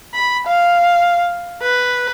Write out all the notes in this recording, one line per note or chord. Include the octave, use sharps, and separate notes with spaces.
B5
F5
B4